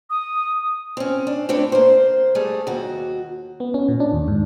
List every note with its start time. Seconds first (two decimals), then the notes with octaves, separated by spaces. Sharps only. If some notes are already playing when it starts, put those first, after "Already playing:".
0.10 D#6
0.97 C4 C#4
1.27 D4
1.49 A3 C4 D4 B4 C#5
1.72 A#3 C5
2.35 G3 A3 G#4
2.67 D#2 F#4
3.60 B3
3.74 C#4
3.88 A#2
4.00 D4
4.13 D#2
4.28 G#2